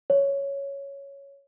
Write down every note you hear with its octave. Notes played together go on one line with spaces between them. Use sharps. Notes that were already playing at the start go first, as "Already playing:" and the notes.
C#5